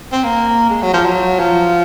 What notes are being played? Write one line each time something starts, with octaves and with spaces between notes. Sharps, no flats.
C4
A#3
G#3
F#3
F3
F#3
F3